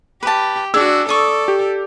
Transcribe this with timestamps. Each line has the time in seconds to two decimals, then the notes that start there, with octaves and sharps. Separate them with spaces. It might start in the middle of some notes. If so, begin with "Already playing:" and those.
0.23 G4 B4 A5
0.74 D4 F#4 G#4 E6
1.09 A4 D5 C#6 D#6
1.48 G4